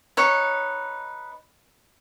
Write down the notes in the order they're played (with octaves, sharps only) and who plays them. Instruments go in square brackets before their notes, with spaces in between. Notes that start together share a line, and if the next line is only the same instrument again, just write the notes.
[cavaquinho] D#4 B4 C#5